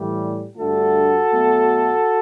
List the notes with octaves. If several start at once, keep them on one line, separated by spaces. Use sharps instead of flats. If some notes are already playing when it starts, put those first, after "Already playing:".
Already playing: A2 E3 G3
G2 D3 A3 F#4 A4
B2 F#3 A3